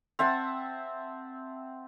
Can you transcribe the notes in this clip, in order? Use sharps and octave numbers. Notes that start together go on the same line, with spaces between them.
C4 E5 F#5 A5